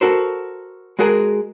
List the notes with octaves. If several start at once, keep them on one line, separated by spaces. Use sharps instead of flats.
F#4 A4 A#4 C5
G#3 F#4 G#4 A#4 G#5